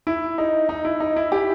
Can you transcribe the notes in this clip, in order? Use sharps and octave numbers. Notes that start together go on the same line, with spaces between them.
E4
D#4
D#4
E4
D#4
E4
E4 G4